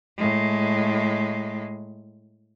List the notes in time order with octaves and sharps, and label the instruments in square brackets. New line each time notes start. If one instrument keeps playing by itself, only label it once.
[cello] A2 G#3